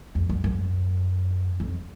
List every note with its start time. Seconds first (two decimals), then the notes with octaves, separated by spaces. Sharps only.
0.15 F2
0.29 F#2
0.44 F#2
1.60 F2